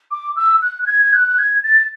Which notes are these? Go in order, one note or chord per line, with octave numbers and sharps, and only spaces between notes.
D6
E6
F#6
F#6
G#6
G#6
F#6
F#6
G#6
A6